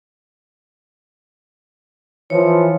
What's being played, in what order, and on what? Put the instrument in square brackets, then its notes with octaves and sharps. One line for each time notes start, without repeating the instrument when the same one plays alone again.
[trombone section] E3 F3 [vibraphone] C#5